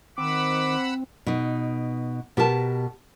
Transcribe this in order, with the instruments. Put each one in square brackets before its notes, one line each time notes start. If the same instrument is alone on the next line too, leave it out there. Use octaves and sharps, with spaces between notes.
[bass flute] D#3 [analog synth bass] C4 [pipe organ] F#5 B5 E6 [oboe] D6
[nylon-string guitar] B2 D#4
B2 G4 A#4 A5